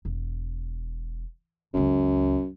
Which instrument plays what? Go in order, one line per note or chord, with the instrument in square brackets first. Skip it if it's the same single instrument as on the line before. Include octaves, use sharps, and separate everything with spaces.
[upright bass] E1
[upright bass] F#1 C#2 [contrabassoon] F#2